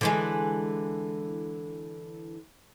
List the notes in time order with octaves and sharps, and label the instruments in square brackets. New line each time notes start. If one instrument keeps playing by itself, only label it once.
[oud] D3 E3 G#3